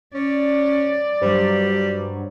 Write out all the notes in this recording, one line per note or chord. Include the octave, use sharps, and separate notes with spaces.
C#4 D5
G2 F#3 G3 C5